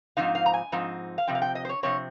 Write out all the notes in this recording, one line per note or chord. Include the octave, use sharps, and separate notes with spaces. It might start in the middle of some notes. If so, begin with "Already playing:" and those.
G#2 F3 C4 D#4 F5
F5
A#5
G#5
G#2 F3 C4 D#4
F5
C3 F3 C4 G5
F5
G5
D#5
C5
C#5
C3 F3 C4 C#5